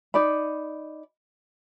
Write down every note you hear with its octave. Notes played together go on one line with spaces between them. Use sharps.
D#4 D5 B5